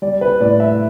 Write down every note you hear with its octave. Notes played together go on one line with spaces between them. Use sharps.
G3 D5
B4
A2 D5
E5